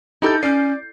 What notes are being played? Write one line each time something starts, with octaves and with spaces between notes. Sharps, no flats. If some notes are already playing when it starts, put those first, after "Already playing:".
D#4 E4 G4 A4 G6
C#4 D5 C7